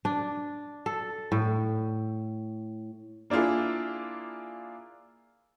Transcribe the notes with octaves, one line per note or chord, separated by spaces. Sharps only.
D4
A4
A2
A#3 D4 E4 F4 G#4